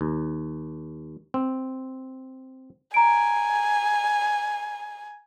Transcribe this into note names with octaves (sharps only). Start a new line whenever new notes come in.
D#2
C4
G#5 A#5 D7